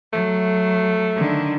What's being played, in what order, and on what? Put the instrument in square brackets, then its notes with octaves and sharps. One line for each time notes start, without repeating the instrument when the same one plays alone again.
[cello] F#3 [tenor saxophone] A3
[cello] D3 D#3